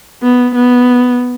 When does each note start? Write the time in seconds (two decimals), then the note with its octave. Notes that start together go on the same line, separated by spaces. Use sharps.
0.23 B3
0.55 B3